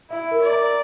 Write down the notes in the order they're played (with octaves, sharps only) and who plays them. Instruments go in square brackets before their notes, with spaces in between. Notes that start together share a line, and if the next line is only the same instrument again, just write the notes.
[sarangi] E4 [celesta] E5
[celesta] A#4
[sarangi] D5
[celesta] A#5